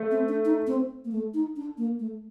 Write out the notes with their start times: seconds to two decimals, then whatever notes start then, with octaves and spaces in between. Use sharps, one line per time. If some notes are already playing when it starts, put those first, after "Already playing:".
Already playing: A3
0.11 C4
0.28 D4
0.45 D#4
0.67 C4
1.05 A#3
1.12 A3
1.34 D#4
1.56 D4
1.78 A#3
2.00 A3